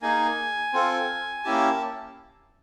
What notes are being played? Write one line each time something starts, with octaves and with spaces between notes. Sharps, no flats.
A#3 D#4 G#4 G#5
C4 F4 A4
A#3 C#4 E4 G4 A5